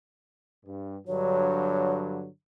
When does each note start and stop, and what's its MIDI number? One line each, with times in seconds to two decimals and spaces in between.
0.66 0.97 43
1.07 2.27 43
1.07 2.27 50
1.07 2.27 54
1.07 1.97 73